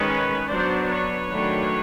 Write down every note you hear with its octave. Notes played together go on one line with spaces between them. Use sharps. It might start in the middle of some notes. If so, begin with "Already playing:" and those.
Already playing: D#3 G#3 C#4 B4 C#5
F#3 B3 D4 C5 D5
B4 C#5
D#3 F#3 A3 D4